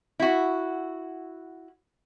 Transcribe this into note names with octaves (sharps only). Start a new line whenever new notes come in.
E4 F#4